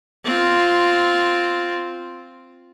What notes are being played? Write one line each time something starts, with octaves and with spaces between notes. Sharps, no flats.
C4 F4